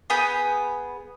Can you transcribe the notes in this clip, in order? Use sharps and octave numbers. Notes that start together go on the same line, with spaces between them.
B3 G#4 B5 G6